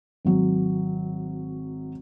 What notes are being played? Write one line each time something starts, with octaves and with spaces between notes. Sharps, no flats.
G#1 F#3